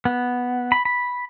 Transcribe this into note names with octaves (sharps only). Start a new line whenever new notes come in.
B3
B5
B5